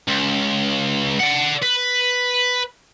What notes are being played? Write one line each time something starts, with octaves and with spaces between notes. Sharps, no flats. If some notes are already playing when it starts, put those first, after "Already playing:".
C#2
D5 F#5
B4